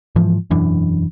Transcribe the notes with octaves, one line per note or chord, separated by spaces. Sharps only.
G#2 E3 F3
E1 F#2 E3 D4